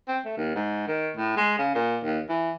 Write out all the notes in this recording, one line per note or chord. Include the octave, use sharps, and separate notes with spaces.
C4
A3
D#2
G#2
D#3
A2
G#3
C#3
A#2
D#2
E3